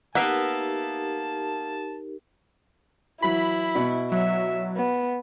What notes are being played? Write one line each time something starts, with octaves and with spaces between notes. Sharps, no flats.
A#3 B3 D#4 G4 A#4 E5 A5
E3 F#3 E4 B5
B2
F#3 E5
B3